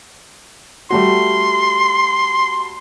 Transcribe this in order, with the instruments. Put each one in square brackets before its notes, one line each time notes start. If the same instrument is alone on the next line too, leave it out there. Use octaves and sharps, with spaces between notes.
[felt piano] G3 A3 F#4 [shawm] C6